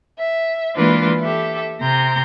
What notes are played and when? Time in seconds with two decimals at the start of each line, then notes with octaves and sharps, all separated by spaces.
0.17 E5
0.75 E3 G#3 A#3 D4 F4 B4
1.21 G4 A4 E5
1.80 C3 A#5 C6 G6